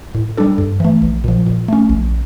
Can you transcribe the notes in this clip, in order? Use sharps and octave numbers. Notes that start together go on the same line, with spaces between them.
A2
G3 D4 A4
G2
E3 A3
A#1
A#2 F3
A#2
A3 C#4
A#1